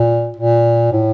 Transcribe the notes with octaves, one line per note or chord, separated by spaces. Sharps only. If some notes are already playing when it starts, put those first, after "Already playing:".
Already playing: A#2
A#2
A2